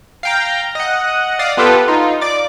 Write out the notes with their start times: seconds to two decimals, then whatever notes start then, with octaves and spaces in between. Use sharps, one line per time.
0.23 F5 G5 A#5
0.75 D#5 F#5
1.39 D5 F5 D#6
1.57 B3 F4 G4 A4 B4
1.88 D#4 F4
2.21 D5 D6